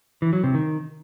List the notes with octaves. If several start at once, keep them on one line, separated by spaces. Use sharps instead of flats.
E3
F#3
C3
D#3